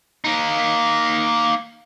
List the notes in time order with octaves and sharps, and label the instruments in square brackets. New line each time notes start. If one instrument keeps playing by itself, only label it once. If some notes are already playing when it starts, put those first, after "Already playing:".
[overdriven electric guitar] A#3 D#4